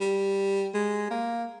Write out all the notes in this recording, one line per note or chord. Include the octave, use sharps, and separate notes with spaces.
G3
G#3
A#3